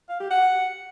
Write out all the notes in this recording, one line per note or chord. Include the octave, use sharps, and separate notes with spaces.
F5
G4
F#5